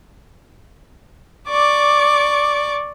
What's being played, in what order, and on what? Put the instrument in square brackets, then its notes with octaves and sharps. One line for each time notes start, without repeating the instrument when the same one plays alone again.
[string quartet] D5 C#6 D6